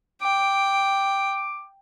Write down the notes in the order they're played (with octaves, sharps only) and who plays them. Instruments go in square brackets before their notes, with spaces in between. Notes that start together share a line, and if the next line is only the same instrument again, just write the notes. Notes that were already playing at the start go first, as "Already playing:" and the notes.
[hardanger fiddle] G5 [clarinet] D6